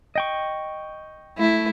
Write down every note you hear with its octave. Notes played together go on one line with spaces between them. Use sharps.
D#5 G5 C#6
A3 E4